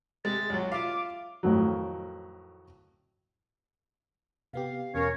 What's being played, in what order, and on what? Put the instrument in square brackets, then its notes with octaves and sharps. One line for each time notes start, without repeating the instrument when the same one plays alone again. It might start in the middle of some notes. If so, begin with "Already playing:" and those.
[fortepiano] C3 G#3 [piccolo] A6
[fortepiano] C#2 F#3
[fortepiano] F4 E5 F5 [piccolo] D6
[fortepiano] F2 A2 D#3 F#3
[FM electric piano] C3 B3 G4 [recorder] F5
[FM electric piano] E2 B2 [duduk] C#4 [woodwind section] A#4 C#5